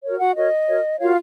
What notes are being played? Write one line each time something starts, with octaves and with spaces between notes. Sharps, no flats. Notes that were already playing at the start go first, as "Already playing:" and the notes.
F#4 A#4 C#5
F#4 F#5
F#4 A#4 C#5 D#5
F#4 A#4 C#5
F4 F#4 A#4 C#5 F5